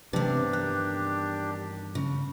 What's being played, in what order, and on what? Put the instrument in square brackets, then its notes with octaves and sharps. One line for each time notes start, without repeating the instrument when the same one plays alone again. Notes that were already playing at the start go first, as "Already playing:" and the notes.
[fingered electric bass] G2 E3 B3 [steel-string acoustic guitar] C3 C4 [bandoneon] D4 G4 [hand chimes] B4
[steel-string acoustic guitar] D#3 [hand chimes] F#6
[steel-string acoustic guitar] C#3